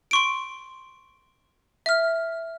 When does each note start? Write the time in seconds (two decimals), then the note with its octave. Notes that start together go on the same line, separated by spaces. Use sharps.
0.11 C6 C#6 D7
1.86 E5 F6